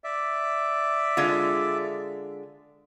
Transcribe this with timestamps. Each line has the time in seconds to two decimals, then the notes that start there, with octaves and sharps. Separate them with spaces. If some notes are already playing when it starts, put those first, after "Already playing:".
0.04 D5 E5
1.17 D3 G#3 F4